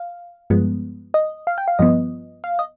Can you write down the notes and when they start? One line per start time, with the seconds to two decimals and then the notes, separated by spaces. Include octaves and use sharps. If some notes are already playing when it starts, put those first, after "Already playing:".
Already playing: F5
0.50 G2 F3 G#3 B3
1.14 D#5
1.47 F5
1.58 G5
1.68 F5
1.79 G2 F3 B3 D#5
2.44 F5
2.59 D#5